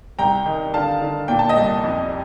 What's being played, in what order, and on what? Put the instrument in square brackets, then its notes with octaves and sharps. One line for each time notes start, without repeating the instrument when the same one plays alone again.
[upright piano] C2 G5 A#5
D#3
D3 F5 A5
D3
A#2 G5
A5
D#5 G5
C2
F2